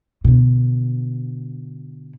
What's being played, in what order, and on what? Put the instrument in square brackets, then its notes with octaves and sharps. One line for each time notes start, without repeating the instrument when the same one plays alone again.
[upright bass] B2 D3